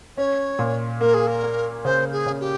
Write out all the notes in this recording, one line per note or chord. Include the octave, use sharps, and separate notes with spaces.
C#4 C#5
A#2
A#3 A#4
G#4
A#4
A#3
C#3 C5
G#4
C#3
G4